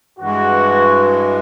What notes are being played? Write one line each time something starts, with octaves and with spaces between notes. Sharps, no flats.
G2 E3 G#3 F#4